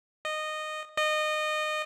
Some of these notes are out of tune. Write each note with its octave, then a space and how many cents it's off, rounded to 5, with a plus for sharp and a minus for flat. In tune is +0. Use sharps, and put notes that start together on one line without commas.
D#5 -15
D#5 -25